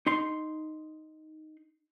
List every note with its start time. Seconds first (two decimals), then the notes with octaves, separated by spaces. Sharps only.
0.06 D#4 C6